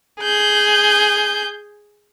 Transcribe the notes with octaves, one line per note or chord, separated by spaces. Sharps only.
G#4 G6